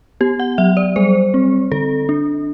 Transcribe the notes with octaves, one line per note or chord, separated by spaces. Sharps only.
B3 G4
F#5
F#3 E5
D5
G3 C5
C4
D3 A4
D4